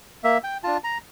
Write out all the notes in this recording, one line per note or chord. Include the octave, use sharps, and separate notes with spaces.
A#3 E5
G5
D4 F4 A5
A#5